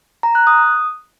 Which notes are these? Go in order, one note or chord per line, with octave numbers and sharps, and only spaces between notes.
A#5
F#6
D#6